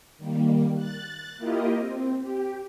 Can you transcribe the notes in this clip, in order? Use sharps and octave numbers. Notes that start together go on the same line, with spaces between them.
D#3 G3 A#3
F#6 A6
A#3 E4 F4 G4 A#4 D#5
C4
G4